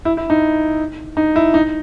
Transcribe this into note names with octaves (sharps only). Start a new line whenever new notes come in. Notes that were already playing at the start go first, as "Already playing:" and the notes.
E4
E4
D#4
D#4
E4
D#4